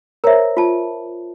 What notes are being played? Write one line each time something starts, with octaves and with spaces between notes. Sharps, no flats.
A#4 C5 C#5 E5 A#5
F4 A5